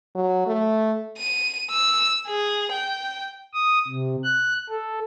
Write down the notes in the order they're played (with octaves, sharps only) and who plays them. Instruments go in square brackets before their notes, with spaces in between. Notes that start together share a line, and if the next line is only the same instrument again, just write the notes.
[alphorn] F#3
A3
[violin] D#7
E6
G#4
G5
[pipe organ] D#6
C3
F#6
A4